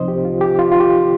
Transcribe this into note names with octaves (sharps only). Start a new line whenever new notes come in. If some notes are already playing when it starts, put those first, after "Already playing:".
Already playing: C2 C3 F3 C4 D#4 C5 D#5
G4
F4
G4
F4
F4
G4